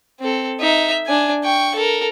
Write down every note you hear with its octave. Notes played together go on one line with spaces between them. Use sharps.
C4 A4
D#4 E5
D4 G#5
G5 C#6
A4 A#4